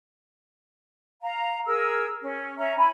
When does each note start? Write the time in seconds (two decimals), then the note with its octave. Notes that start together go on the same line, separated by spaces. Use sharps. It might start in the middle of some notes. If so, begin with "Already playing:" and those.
1.22 F5 A#5
1.65 G#4 A#4 E6
2.22 C#4
2.57 C#4 E5 A#5
2.77 E4 G#5 B5